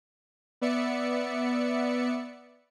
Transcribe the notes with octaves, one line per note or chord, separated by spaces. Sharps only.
B3 D5 E5 C#7